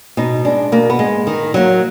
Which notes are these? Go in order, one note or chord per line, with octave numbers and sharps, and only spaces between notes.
B2 D#4
G#3 D4
B2 A#3
B3
G#3
D#3
F#3 A#3